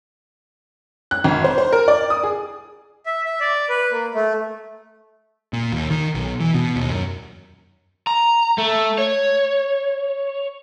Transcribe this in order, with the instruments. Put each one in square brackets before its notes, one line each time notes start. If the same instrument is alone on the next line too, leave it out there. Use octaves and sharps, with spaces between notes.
[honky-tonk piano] F#6
G#1
C5
C5
A#4
D5
D#6
G#4
[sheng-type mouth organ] E5
E5
D5
B4
A#3
A3
[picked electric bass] A#2
D#2
D#3
B1
E3
B2
D#2
F#2
[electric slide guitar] A#5
A3
C#5